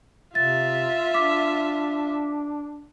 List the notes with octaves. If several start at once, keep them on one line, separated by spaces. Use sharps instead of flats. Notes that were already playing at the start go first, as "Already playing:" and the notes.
C3 F4 E5 A6
D4 D6 B6